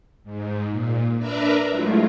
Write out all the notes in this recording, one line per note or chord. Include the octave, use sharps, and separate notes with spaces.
G#2
A#2
D4 A#4 B4 D5 E5 A#5
F#3 G#3 A3 E4 F4